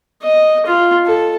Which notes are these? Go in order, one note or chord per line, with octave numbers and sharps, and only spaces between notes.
D#5
F4
A4